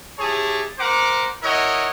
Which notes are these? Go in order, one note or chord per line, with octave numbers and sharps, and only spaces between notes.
E4 G4 G#4 C#5 A5
A#4 C5 F#5 A#5 D6
E4 A#4 C#5 D#5 F#5